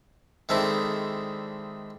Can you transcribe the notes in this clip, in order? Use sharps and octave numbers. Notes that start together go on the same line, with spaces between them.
D#3 G#3 A3 C4 D4 E4